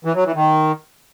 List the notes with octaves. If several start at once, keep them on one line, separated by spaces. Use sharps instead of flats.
E3
F#3
E3
D#3